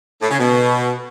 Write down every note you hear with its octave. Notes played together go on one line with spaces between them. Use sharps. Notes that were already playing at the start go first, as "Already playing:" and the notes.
A2
C#3
B2